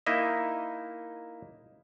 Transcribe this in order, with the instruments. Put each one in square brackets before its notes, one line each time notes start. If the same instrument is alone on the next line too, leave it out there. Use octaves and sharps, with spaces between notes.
[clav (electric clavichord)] A#3 D#4 E4 D#5 E5